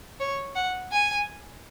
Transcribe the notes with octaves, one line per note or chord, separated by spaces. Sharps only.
C#5
F#5
G#5